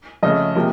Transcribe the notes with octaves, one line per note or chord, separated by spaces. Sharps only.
F2 C#3 A3 D#5
C3 F3 A#3